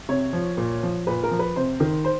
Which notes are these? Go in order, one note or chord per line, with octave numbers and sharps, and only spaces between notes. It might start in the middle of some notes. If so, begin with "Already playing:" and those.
C3 C#5
F3
A#2
F3
A#2 B4
A#4
F3
B4
C3 C5
D#3
C5